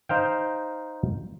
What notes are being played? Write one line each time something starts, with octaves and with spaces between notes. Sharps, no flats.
D#4 C5 F5 G5